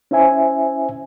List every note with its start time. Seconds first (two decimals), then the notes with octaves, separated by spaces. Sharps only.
0.11 C#4 E4 C5 E5 G#5